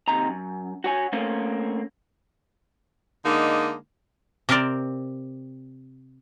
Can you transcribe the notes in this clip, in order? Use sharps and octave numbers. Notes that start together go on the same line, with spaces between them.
D#2 C3 D#4 A#5
F#2
F#4 C#5 G#5
A3 A#3 C4 C#4
D3 G#3 A#3 D#4
C3 C4 A#4 C5 D5